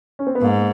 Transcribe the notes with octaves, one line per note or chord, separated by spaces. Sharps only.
C#4
C4
B3
G#2 A#3